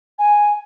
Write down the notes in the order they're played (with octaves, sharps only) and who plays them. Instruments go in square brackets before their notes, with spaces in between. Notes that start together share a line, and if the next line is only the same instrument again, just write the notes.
[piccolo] G#5